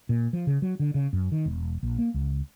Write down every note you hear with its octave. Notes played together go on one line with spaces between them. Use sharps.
A#2
F3
C#3
F#3
D3
C#3
F#2
D#3
E1
A#1
A#3
C#2